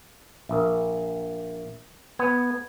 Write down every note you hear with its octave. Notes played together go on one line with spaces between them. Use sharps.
A#1 A#4 E5
B3 G#6